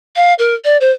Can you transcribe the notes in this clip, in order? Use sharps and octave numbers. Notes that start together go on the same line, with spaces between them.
F5
A#4
D5
C5